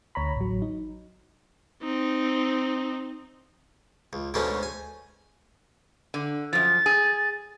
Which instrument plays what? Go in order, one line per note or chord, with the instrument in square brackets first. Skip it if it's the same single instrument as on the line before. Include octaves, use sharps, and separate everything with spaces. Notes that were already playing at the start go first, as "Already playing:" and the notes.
[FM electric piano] D2 C#5 A#5 B5
A1 F#3
D#4
[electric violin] C4 D#4
[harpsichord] C#2
D2 G#2 B2 A3 B3 C#4
G#5
[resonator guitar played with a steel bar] D3
[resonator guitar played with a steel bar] F#2 F3 [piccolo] A6
[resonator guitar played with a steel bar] G#4